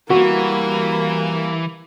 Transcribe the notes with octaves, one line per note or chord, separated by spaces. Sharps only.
E3 G3 A#3 F#4